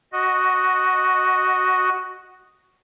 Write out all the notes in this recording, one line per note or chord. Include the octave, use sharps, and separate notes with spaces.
F#4 D#5